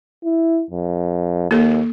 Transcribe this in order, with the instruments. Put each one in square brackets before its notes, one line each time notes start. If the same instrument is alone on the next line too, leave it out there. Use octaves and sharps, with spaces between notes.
[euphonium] E4
F2
[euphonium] D#2 [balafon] A#3 A4